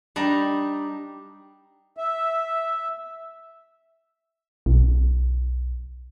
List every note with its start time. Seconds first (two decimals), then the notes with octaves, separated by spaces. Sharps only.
0.16 G3 D4 D#4 A#5
1.97 E5
4.66 B1